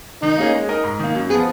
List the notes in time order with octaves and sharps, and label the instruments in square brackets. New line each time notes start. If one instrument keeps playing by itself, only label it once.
[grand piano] D#3 [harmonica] D#4
[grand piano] A#3 C#4 G#4 D#5
G#3
D#4 A#4 D#5
G#2
D#3 A#3
F#2
[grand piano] F3 B3 [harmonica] G#4